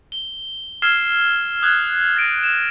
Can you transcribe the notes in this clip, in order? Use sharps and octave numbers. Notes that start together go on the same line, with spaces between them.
G7
E6 F6 G#6 C7 E7 G7
D#6 F#6 G#6
A6 A#6 D7 D#7
E7